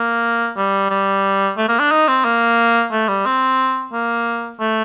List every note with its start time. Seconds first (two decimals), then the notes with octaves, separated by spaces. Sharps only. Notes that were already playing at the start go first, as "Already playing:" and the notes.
Already playing: A#3
0.57 G3
0.90 G3
1.57 A3
1.69 A#3
1.80 D4
1.91 D#4
2.08 C4
2.25 A#3
2.92 A3
3.08 G3
3.26 C4
3.92 A#3
4.60 A3